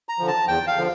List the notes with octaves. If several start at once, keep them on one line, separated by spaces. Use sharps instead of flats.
A#5
D3 F3
A5
E2 G5
F5
D3 F3